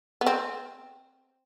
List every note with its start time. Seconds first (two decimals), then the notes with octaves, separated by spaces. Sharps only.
0.21 B3
0.26 C4